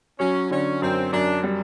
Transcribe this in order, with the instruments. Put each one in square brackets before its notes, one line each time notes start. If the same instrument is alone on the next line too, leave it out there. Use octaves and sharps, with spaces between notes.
[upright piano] F#3 [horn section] C#4
[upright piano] D3 [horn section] C#4
[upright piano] F#2 [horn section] C4
[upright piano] F#2 [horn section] D4
[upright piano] G3